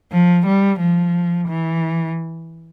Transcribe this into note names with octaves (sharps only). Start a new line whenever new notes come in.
F3
G3
F3
E3